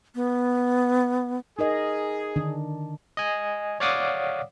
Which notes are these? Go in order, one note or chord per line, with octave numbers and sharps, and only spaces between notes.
B3
D#4 G#4 A#4 D#5
D3 D#3 D4
D#5 G#5
C#5 D5 F5 F#5 D6 D#6